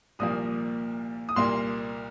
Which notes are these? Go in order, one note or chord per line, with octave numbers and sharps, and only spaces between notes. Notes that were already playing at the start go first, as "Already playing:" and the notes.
C2 A#2 F3 A#3 D#6
D#6
C2 A#2 A#3 C6